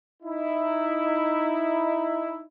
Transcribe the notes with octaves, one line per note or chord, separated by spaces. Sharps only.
D#4 E4